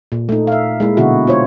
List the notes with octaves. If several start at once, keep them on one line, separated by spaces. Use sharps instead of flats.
A#2
A3 D#4
E5 F5
G#3 A#3 E4
B2 D3 E4 F#4
F4 C5 C#5